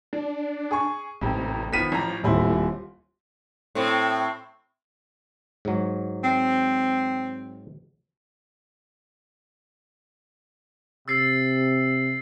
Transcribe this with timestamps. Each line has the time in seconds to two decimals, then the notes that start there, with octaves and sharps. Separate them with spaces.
0.13 D4
0.71 G#4 C#6
1.21 A1 F2 G#2 C3
1.73 D#3 F3 B3 B6 D#7
1.92 A1 F3 A#5
2.24 D#1 A2 C4 E4 C6
3.75 A2 C4
5.65 G#2 F#3
6.24 C4
11.08 C3 E6 A6 C7